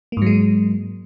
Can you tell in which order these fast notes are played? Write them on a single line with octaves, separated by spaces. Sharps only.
A#3 G#2 F#3 G#3